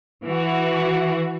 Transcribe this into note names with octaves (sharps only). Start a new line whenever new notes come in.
E3 F#4